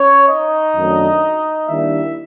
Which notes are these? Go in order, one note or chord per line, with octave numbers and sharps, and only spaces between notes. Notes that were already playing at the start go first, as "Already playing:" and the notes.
Already playing: C#4 C#5
D#4 D#5
F#2 D#3 F#3 A3 D4
D#3 G3 A#3 D4 E4 E5